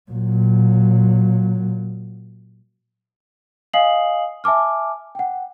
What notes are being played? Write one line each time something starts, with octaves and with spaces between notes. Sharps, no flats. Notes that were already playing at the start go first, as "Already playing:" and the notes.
A#2 F#3
D#5 F5 G#5 D#6 C7 F#7
E5 G#5 A5 D6 F6
F#5 G5